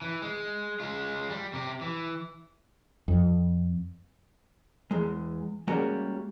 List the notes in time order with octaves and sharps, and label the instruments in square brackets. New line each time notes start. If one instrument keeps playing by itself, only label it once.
[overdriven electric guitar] E3
G#3
G#3 F4
G3
C3 G4
E3
[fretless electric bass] F2
[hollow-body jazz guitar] E2 G#3
G3 G#3 A#3 C#4 F#4 A#4